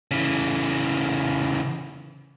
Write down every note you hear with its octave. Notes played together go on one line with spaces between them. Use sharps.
C#3 E3